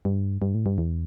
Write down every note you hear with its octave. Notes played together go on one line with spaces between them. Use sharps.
G2
G2
A2
G2
E2